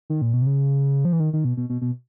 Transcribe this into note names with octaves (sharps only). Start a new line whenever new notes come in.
D#3
A#2
B2
C3
C#3
F3
E3
D#3
D#3
B2
B2
B2
B2